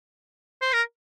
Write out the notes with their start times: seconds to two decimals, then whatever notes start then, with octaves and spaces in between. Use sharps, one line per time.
0.62 C5
0.73 A#4